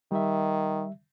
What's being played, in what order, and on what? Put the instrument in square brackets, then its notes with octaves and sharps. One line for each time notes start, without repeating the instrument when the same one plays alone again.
[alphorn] D#3 [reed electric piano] G3 E5